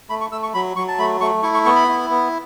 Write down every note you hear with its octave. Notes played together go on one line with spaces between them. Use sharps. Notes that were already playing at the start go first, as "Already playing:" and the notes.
A3 B5
C#6
A3 E6
C#6
F#3 B5
F#3 C#6
A5
A3 B5
A3 C#6
E4 C#6
C#6
B3 C#6
B5
E4
B3